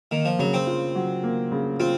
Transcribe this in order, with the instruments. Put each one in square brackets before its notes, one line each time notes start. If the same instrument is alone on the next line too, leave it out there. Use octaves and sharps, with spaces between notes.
[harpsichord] D#3 [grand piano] A#3
[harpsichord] F3
[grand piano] C#3 [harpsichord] F#3
[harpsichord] C4
[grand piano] F4
F#3
A#3
C#3
[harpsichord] C4 [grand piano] F4